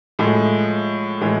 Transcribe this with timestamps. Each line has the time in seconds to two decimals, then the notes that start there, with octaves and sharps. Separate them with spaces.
0.19 A2 F3 G#3
1.21 A2 E3 G#3